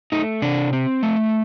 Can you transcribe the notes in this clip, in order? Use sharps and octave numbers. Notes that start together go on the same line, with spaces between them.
A3 D#4
C3 D4
C4
A3